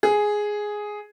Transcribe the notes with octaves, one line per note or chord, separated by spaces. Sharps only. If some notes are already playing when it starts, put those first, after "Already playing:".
G#4